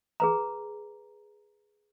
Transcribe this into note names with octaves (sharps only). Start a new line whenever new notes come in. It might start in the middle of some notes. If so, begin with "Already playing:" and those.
G#4 B4 A#5